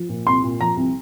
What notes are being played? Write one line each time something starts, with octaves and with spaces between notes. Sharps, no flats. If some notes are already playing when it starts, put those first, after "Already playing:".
Already playing: F3
A#2
C2 C6
A#2
F3 A#5
C2